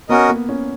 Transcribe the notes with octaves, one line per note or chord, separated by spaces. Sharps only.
B3 C#4 F#4 A#4 D#5
A#3
C#4